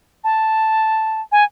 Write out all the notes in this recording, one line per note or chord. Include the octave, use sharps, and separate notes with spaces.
A5
G#5